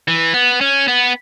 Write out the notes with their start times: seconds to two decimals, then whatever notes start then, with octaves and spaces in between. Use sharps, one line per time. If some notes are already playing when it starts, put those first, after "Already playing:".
0.08 E3
0.34 B3
0.61 C#4
0.88 B3